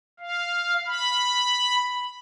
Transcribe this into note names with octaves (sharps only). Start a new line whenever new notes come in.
F5
B5